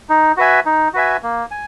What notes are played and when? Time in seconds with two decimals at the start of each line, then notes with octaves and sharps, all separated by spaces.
0.09 D#4
0.37 F#4 B4 E5 G#5
0.66 D#4
0.94 F#4 B4 E5 G#5
1.23 A#3
1.51 G#5